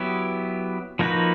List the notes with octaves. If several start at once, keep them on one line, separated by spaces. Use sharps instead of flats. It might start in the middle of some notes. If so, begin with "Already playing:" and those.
Already playing: F#3 B3 E4 G4
F3 A#3 D#4 F#4 B4